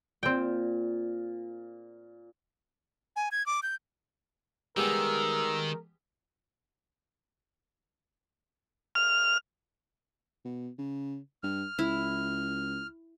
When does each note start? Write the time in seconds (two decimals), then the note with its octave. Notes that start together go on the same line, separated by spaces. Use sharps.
0.23 A#2 C4 G5
3.16 G#5
3.32 G#6
3.46 D6
3.63 G6
4.77 D#3 G3 G#3 B3 A#4 E6
8.95 F6
10.45 B2
10.78 C#3
11.43 G2 F6
11.79 C#2 E4